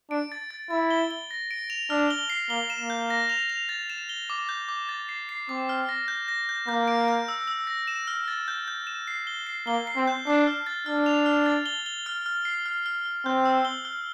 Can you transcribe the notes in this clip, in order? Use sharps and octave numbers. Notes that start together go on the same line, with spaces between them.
D4 D7
A6
A6
E4 A6
G7
G7
A#6
D7
F7
D4 F6
G7
C7
A#3 G7
E7
A#3
G6
A#6
F7
F7
A6
E7
G7
D6
G6
D6
A6
C7
C7
C4 D6
F6
A#6
G6
A#6
G6
A#3 G6
D7
G6
E6
E6
A#6
E7
F6
A6
G6
G6
E7
C7
G7
C7
A#3 G7
C7
C4
G6
D4 C7
F6
A6
D4 F6
F7
F6
A6
G7
G7
F6
F6
C7
F6
F6
F6
C4 G6
E6
G7
F6